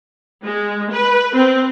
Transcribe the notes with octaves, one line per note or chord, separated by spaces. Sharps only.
G#3
B4
C4